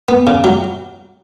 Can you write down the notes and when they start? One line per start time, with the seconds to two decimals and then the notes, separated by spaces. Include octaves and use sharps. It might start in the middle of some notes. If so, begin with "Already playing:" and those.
0.09 B3
0.27 C#3
0.44 F#3